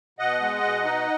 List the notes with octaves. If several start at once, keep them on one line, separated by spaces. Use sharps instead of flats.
B2 D#5 F#5
G#3
B2
D#4